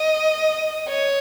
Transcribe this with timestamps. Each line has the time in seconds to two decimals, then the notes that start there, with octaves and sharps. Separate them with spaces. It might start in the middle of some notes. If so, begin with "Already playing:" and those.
Already playing: D#5
0.89 C#5